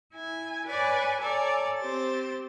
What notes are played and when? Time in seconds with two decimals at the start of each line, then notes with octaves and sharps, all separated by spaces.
0.14 E4 G#5
0.66 B4 C#5 D5 G#5
1.21 A4 C#5 D5 G#5 A#5
1.79 C4 G4 C5 A6